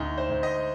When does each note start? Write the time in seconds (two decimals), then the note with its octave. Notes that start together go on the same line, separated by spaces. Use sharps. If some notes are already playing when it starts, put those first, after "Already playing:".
Already playing: D2 D#4
0.18 C5
0.30 D2
0.43 D#5